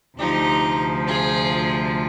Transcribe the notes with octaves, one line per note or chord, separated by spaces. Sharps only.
D2 C3 F3 D#4 G4
F4 G#4